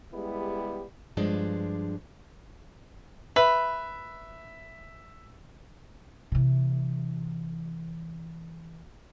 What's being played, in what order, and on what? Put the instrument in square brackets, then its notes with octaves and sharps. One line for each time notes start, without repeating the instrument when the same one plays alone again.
[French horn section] G3 G#3 B3 E4 G4
[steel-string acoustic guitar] G2 F3 G#3 D4
[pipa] B4 [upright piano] E5
[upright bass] C3 E3